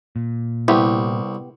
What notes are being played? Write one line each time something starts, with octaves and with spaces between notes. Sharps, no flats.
A#2
C2 B3 E4 G4